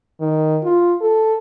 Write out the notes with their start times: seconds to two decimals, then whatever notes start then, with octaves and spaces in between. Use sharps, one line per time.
0.20 D#3
0.64 F4
1.01 A4